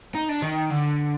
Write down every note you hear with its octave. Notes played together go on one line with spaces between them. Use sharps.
D#4
D4
D#3
D3